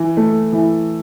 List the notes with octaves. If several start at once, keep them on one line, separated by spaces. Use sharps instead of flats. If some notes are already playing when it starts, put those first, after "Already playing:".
Already playing: E3
A3
E3